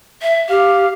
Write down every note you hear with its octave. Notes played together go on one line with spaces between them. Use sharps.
E5
G4 F5